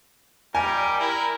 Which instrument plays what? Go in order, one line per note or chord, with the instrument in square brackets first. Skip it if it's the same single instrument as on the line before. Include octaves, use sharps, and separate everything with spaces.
[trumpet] G3 [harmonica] A#4 [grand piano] G#5
[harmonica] E4 [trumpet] A#4